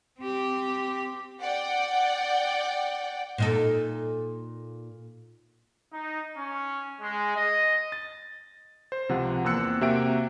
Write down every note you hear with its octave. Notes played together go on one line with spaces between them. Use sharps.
C4 G4
D5 F#5 G5
A#2 D#4 A4
D#4
C#4
G#3
D#5
A6
C5
C#2 C3 F3 F#5
E2 A#3 C4 E6 F#6 C#7
C3 A#3 F#4 E5 G5 D7